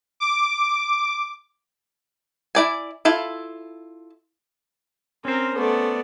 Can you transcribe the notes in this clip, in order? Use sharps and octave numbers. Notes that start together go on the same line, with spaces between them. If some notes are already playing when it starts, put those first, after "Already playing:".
D6
E4 D5 G#5
E4 F4 A4
C4 C#4 A#4 C5
A3 B3 D5